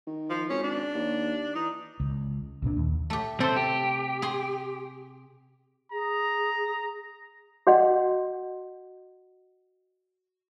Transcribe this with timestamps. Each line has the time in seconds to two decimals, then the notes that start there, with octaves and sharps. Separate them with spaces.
0.07 D#3
0.30 F3
0.50 G#1 C#4
0.64 D4
0.94 D#2
1.55 E3 D#4
2.00 C#2
2.62 C2 A#2 D4
2.77 D#2
3.10 A3 G4
3.40 C3 A3 C4 A4 C5
3.56 G4
4.22 G#4 G#5 C6
5.92 G#4 A#5
7.67 F#4 D5 D#5 F#5